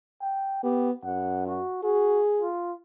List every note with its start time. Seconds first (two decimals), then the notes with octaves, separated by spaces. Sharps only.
0.22 G5
0.63 B3 G4
1.04 F#2 F#5
1.46 F#4
1.83 F#4 G#4
2.40 F4